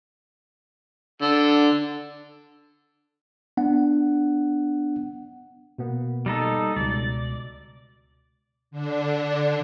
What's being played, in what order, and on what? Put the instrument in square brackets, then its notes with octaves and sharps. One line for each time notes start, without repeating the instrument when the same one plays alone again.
[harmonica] D3
[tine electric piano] B3 D4 F#5
B2 A#3 B3
[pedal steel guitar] G3 D#4 A4
[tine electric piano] C#2 B2 [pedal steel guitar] D5
[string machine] D3 D4